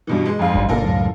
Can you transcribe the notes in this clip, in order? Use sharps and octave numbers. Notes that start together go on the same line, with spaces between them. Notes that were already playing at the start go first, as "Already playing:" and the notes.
G2 B2 E3
G#3
F2 G#2 F5
G#1 G2
G1 B2 A#3 F4 A4 A#4
C#2 F#2 A2